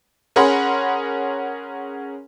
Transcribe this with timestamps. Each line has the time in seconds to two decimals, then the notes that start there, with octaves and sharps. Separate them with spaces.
0.36 C#4 G#4 A#4 F#5 B5 C6